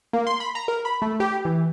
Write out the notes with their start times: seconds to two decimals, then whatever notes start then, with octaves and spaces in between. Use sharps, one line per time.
0.13 A#3
0.27 C6
0.40 B5
0.55 A#5
0.68 A#4
0.85 B5
1.02 A3
1.20 G4
1.45 E3